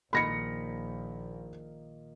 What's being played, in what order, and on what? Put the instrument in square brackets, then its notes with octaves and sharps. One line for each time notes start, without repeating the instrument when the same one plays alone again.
[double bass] A#1 [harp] A#2 D#3 A#3 [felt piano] B5 A#6 C#7